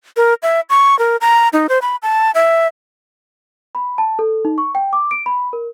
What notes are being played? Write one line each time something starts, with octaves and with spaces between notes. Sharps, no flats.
A#4
E5
C#6
A#4
A#5
D#4
C5
B5
A5
E5
B5
A5
A4
D#4
C#6
G5
D6
D7
B5
A#4